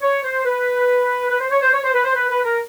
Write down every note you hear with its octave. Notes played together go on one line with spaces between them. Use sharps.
C#5
C5
B4
B4
C5
C#5
C5
C#5
C5
B4
C5
B4
B4
A#4